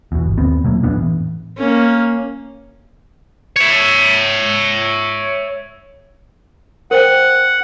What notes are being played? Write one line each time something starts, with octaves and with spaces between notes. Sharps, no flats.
E2 B2
G1
D#2 B3 C4
B2 F#3 A3 A#3
F2 B3 D4
A2 E3
A#3 C#4
C#5 E5
A#4 C5 F#5 G5